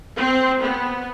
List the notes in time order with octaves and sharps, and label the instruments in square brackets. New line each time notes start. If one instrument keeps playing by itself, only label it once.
[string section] C4
B3